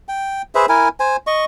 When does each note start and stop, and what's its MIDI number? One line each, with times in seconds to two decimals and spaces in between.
0.08 0.42 79
0.55 0.66 68
0.55 0.66 71
0.55 0.66 72
0.55 0.66 76
0.69 0.88 64
0.69 0.88 70
0.69 0.88 80
1.00 1.16 72
1.00 1.16 80
1.27 1.45 75
1.27 1.45 85